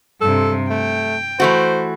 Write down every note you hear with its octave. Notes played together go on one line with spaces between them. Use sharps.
G2 C3 A4
A3 G5
E3 A3 F#4 C5